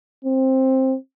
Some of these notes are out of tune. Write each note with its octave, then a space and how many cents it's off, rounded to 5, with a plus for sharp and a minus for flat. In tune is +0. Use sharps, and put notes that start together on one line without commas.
C4 +10